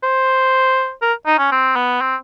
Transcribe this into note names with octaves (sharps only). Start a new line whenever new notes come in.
C5
A#4
D#4
C#4
C4
B3
C4